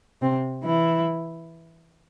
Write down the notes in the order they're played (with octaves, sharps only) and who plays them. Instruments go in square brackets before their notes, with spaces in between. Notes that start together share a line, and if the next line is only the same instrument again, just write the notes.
[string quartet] C3 C4
E3 E4